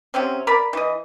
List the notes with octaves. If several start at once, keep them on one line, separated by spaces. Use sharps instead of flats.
C3 F#3 C4 C#4
A#4 D5 B5
E3 D#5